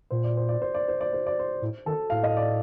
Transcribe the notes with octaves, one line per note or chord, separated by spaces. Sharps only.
A#2 C5
D5
C5
D5
C5
D5
C5
D5
C5
D5
C5
A2
D#3 A4
A2 F5
D#5
D5